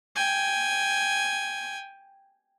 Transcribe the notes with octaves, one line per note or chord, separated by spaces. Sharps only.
G5 G#5